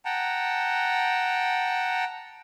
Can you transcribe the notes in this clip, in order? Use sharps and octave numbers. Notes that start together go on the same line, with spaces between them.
F#5 G5 A5 A#5